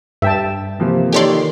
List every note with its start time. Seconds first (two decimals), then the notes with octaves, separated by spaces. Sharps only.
0.22 G2 E5 G5 A5
0.80 C3 E3 F3 A#3
1.13 D#3 G4 A4 C#5 D5 C6